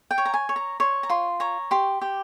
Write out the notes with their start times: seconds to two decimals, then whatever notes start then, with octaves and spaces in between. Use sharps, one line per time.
0.11 G5
0.18 C#5
0.25 A#5
0.34 G#5
0.49 C#5
0.56 A#5
0.80 C#5 C6
1.03 A#5
1.10 F4 C6
1.40 C#5 A#5
1.71 G4 C6
2.02 G4